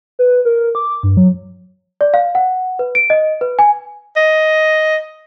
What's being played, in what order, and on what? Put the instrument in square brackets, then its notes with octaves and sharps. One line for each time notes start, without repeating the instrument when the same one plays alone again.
[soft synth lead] B4
A#4
D6
G2
F#3
[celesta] D5
F5
F#5
B4
D7
D#5
B4
G#5
[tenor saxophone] D#5